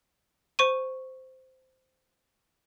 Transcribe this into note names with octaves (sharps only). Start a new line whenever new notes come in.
C5 C#6 D#7